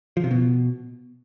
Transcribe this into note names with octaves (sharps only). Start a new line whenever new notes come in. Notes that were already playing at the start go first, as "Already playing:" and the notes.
F3
C3
B2